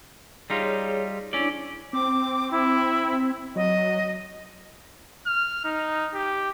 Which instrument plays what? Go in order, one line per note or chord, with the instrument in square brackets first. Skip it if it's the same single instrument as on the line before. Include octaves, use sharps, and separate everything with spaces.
[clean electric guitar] G3 D#4 F4 [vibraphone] G#4 C#5
[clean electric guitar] C#4 D5 [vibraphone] D4 E4
[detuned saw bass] C4 [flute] D6
[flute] E4
[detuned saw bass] F#3 [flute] D#5
[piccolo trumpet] F6
D#4
G4